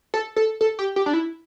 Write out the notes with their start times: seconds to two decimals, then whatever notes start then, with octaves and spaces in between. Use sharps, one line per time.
0.14 A4
0.36 A4
0.61 A4
0.79 G4
0.96 G4
1.06 D4
1.13 E4